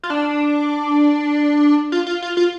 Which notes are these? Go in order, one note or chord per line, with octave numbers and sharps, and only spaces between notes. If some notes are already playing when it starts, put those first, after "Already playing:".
F4
D4
F4
F4
F4
F4